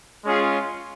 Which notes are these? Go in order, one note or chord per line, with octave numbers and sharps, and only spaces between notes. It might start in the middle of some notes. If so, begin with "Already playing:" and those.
G#3 C#4 F4 G#4